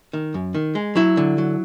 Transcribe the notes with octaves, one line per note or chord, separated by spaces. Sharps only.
D#3
F#2
D#3
G#3
F#3 E4
D3
F#3